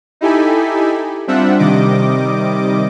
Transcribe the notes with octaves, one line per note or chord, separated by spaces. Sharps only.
D#4 E4 G4 A4 G#5 B5
G3 C4 D4 F4 E5 F#5
C3 D#3 G3 D#5 D6